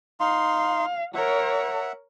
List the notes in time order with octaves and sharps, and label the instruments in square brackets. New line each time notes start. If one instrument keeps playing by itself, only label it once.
[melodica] D#4 C6 [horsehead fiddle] F5
[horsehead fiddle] A#4 C#5 [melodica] E5 F#5